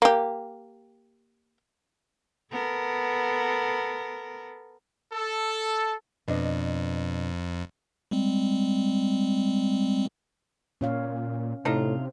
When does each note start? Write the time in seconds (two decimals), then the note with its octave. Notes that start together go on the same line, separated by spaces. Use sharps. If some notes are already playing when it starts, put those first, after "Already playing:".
0.02 A#3 G4
2.51 B3 A4 A#4
5.13 A4
6.28 F2 B2 D4 D#5
8.11 G3 G#3 C4
10.81 A#2 C#4 C#5 F5
11.65 A2 C3 D4 D#4 F4